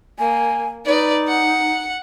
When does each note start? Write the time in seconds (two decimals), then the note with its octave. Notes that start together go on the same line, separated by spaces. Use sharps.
0.19 A#3 G#5
0.86 D#4 B4 D5
1.28 F#5